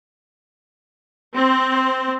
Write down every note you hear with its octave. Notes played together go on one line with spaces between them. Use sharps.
C4 C5